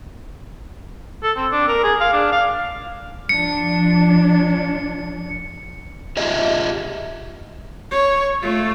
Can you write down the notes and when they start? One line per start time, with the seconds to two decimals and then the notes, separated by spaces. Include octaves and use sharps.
1.23 A4
1.37 C4
1.51 D4
1.68 A#4
1.84 G#4
2.00 F5
2.13 D4
2.32 F5
3.29 F3 D4 C#7
6.17 F4 G4 G#4 D#5 E5
7.91 C#5
8.41 A3 F4